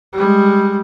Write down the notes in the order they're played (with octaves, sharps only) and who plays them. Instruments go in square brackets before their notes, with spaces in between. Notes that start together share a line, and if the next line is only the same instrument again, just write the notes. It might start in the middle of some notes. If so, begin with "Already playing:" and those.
[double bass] G3 G#3